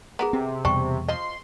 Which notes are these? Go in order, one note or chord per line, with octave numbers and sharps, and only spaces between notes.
B3 G#4 A#4 A#5
C3 C4
E2 B2 G3 D4 G5 C#6
F3 D#5 C6